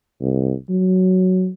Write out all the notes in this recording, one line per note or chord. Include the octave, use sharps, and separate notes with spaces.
C2
F#3